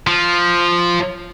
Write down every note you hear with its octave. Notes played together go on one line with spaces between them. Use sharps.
F3